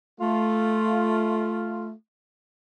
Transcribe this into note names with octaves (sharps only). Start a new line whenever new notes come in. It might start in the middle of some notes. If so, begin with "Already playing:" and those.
A3 F4